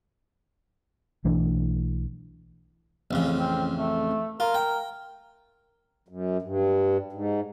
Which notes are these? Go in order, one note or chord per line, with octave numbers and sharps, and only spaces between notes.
B1 E3 A3 D4
A1 F2 C#3
C4
A3
F4 A#4
G5
F#2
G2
G#2